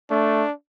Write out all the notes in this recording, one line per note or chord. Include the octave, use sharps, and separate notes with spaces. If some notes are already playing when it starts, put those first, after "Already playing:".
A3 D4